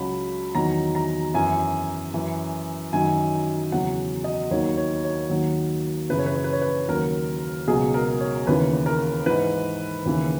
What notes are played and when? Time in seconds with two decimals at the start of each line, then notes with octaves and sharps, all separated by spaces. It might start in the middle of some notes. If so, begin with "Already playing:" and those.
Already playing: C#2 C#3 F#3 B5
0.55 E2 D#3 F#3 A#5
0.95 A#5
1.34 F#2 E3 G#5
2.14 F#2 E3
2.92 F#2 D#3 F#3 G#5
3.72 E2 C#3 F#3 F#5
4.24 D#5
4.51 D#2 D#3 F#3 C#5
4.77 C#5
5.04 C#5
5.30 D#2 D#3 F#3
6.10 F#2 C#3 E3 B4
6.19 C#5
6.26 B4
6.36 C#5
6.44 B4
6.53 C#5
6.62 B4
6.89 D#2 C#3 F#3 A#4
7.68 C#2 B2 F#3 G#4
7.94 A#4
8.20 C#5
8.47 D#2 C#3 E3 B4
8.86 A#4
9.26 G#2 E3 B4
10.06 D#2 C#3 E3